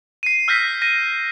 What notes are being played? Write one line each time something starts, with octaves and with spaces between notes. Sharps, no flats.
C7 D#7
E6 F6 G6 A#6 B6
A#6 D#7